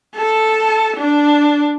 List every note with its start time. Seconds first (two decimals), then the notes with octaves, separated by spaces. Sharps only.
0.15 A4
0.96 D4